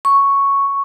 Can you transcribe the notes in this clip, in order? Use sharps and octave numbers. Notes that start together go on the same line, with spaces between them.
C#6